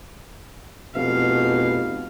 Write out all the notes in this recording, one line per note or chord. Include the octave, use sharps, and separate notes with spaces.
F1 B2 F5